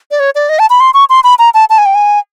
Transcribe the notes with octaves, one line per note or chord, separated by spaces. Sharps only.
D5
C#5
D5
D#5
A5
B5
C6
C#6
C6
B5
A#5
A5
A5
G#5
G5
G#5